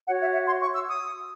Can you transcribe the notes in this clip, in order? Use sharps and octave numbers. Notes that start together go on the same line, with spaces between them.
F#4 C#5 F#5
E5
E5
C6
C#6
E6
D#6